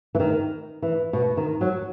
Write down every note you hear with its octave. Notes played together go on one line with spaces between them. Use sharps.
E3
D#3
E3
B2
D#3
F#3